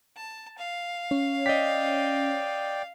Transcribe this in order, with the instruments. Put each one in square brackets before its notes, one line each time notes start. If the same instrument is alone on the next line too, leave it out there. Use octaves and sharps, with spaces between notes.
[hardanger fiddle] A5
F5
[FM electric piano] C#4 C#5
[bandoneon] D5 G5 [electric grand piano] D#5 B6